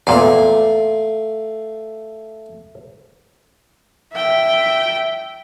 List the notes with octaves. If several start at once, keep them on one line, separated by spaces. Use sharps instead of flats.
E2 A#2 A3 F5
E5 G5